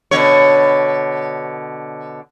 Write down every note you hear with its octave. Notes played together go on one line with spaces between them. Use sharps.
B2 D3 C#5